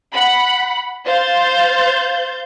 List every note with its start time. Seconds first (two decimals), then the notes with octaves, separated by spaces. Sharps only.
0.12 F#5 B5
1.06 C5 F5 G6 A6